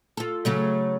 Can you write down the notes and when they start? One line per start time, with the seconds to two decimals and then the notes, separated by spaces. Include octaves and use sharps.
0.17 F4 A4
0.45 C#3 F#3 A3